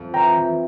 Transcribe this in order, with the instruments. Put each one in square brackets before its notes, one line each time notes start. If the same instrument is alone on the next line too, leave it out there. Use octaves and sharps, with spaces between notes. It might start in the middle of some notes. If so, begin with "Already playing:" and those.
Already playing: [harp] F2
[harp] E3 [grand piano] G5 A#5
[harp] E3